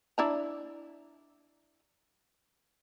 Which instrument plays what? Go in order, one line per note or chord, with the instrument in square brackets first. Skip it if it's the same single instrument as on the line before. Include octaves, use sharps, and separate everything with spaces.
[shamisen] D4 E4 A#5